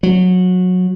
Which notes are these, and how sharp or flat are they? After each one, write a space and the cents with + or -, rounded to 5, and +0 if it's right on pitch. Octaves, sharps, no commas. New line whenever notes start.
F#3 -20